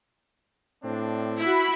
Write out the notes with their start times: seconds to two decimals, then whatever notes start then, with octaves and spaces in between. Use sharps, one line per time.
0.84 A2 C4 D4
1.38 E4 F#4 B5